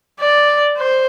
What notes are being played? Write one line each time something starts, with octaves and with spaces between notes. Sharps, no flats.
D5
C5